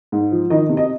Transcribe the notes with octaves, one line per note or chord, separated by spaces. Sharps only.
G#2
F3
D#3 D#5
C3
D#5